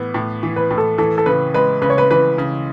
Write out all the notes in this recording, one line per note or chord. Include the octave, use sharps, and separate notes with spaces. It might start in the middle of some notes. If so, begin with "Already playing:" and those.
Already playing: A2 E3 B3
A2
E3
B4
A2
A4
E3 A4
A4
C#3 B4
G#3 B4
C#3 B4
C#5
B4
E3 B4
C#3